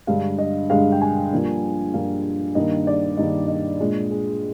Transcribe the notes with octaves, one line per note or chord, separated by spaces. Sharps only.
G2 D3 G#3 D4 F5
D#5
G2 D3 G#3 D4 F5
G5
G#5
G2 F3 A#3 D4
G2 F3 A#3 D4 F5
G2 D#3 A#3 D#5
D5
G2 D#3 A#3 D#5
D#5
A#2 G#3 D4
G#4